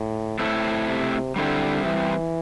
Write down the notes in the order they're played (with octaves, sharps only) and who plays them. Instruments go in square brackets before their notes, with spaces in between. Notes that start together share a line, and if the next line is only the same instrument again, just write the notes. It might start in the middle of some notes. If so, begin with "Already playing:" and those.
Already playing: [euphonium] A2
[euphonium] A2 [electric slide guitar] A3 C4 E4 A4
[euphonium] C3
[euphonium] D3 [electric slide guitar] G3 C4 E4 G4
[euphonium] E3